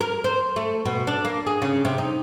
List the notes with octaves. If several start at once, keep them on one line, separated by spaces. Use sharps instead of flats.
A#4
C5
A3
B2
D4
A#3
G#4
C#3
C3
D#4